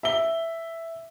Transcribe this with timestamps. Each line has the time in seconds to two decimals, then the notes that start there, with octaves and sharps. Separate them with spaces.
0.03 E5 G7